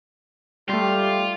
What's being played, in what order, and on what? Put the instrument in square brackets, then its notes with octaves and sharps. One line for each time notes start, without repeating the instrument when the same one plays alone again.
[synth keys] G3 A3 [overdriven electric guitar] F4 [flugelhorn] G4